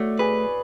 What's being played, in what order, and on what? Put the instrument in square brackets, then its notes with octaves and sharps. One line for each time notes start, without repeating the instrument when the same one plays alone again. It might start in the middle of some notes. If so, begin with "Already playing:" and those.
Already playing: [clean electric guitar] A3 [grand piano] F#4 C#5 D5
[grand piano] G#4 [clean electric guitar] B4